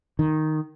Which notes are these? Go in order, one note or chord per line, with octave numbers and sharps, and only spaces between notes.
D#3